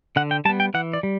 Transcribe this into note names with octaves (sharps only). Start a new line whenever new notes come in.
D3 F#5
G5
G3 B3 A5
G5
E3 F#5
D5
G3